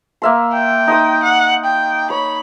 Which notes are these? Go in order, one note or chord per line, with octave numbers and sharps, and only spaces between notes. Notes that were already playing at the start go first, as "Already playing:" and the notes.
A#3 E5 C6
G5
D#4 C6 D#6
F#5
G5
C#5 B5